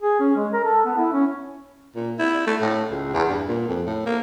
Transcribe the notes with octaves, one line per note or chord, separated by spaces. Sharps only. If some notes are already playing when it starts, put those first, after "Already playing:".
G#4
C#4
G#3
A#4
A4
B3
E4
C#4
A#2
E4
A3
A2
C#2
E2
G2
A#2
F2
A2
A#3